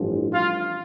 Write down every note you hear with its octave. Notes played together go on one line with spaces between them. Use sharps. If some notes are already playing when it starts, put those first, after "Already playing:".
Already playing: A1 G2 F3
F4 F5